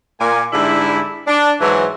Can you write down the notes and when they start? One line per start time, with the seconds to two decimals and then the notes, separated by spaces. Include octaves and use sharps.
0.20 A#2 A#3 D5 G#5
0.53 G#2 D3 G3 E4
1.27 D4
1.61 G#2 E3 F#3